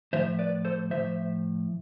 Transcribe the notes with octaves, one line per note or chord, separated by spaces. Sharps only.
A2 F3 C5 E5
B4 D5
A4 C5
A2 F3 C5 E5